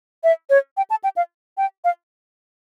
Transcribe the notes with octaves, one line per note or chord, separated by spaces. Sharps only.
E5
C#5
G5
A5
G5
F5
G5
F5